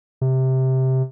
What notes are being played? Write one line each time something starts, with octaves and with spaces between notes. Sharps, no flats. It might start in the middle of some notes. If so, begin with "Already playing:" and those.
C3